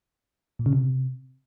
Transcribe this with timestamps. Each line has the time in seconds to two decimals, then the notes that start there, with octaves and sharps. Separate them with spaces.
0.59 A#2
0.66 C#3
0.73 C3